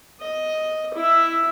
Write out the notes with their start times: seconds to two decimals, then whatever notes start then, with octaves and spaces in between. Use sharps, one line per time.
0.21 D#5
0.94 E4 E5